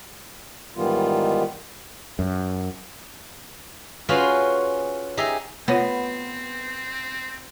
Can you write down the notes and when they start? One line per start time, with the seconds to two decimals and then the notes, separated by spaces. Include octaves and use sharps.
0.76 G#2 D#3 E3 G3 B3 F4
2.19 F#2
4.09 C#4 F4 F#4 G#4 B4 C5
5.17 D#4 G4 G#4 D#5 E5
5.68 B3 C4 F4 C#5 F#5